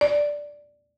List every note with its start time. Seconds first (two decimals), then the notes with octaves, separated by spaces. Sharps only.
0.01 D5